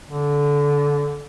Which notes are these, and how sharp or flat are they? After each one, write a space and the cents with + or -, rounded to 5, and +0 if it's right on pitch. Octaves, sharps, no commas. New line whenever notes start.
D3 -20